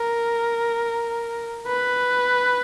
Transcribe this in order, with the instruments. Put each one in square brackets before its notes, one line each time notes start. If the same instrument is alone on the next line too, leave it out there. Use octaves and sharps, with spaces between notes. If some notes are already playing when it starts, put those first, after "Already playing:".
Already playing: [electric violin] A#4
B4